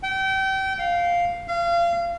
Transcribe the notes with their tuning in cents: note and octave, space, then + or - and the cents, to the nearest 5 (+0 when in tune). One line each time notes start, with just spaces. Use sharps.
G5 -30
F5 +0
F5 -30